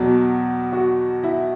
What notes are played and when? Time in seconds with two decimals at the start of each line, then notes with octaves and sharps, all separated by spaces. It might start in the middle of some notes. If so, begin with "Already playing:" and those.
Already playing: E2 B2 F#3
0.72 F#4
1.23 E4